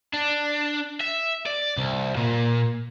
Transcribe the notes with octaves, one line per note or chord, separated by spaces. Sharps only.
D4
E5
D5
C2
A#2